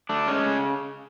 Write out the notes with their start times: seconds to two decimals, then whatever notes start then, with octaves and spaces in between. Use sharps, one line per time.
0.09 A3 D4
0.28 G#3 C#4
0.47 C#3